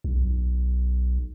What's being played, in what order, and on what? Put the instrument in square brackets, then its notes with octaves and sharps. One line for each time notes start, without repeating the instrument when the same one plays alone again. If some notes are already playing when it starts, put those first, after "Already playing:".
[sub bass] B1